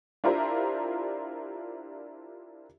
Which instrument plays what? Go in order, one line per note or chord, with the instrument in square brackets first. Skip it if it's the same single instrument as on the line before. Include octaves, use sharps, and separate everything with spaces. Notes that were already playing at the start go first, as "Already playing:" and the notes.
[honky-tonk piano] D4 E4 F4 G4 A#4 C5